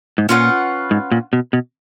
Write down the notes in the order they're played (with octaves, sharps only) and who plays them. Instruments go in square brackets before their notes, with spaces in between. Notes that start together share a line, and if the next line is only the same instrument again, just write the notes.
[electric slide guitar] G#2
[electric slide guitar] A#2 [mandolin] C#4 F4 B4 F#5
[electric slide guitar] G#2
A#2
B2
B2